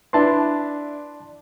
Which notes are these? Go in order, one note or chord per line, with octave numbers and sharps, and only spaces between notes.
D4 E4 B4 D5 A5 C6